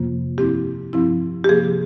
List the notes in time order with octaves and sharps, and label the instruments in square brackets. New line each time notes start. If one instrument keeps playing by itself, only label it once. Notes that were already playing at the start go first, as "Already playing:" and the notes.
Already playing: [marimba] F2 C3 F3 A#3 F4
G2 F3 C4 E4 G4
G2 F3 C4 E4
G4
C3 F3 A#3 G#4